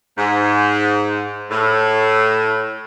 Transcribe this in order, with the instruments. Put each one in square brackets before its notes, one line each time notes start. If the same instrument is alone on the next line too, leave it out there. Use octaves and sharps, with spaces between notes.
[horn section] G#2
A2